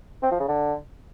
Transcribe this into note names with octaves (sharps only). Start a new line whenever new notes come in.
C4
F3
C#3
D3